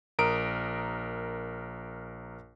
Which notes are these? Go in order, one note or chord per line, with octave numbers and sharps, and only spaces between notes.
A#1 A#4 A#5 D#6 D7